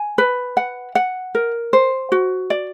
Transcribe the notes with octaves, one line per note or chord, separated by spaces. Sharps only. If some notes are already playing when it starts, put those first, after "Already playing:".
Already playing: G#5
B4
F#5
F#5
A#4
C5
F#4
D5